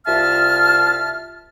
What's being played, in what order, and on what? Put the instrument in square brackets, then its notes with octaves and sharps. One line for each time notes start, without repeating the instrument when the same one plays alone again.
[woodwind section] C2 F4 E5 F5 A5 F6